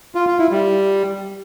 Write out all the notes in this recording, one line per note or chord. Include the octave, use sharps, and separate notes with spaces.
F4
F4
E4
G3